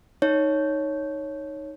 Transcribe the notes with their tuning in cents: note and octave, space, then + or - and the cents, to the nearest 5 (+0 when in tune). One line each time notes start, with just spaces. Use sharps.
D#4 +0 C#5 +0